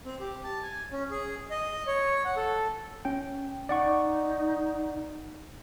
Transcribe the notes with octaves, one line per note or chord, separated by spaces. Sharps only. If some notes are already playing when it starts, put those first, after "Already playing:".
C4
G4
A5
G#5
C#4
G#4
D#5
C#5
F#5
A4
C#4 G5
D#4 D5 F#5 C#6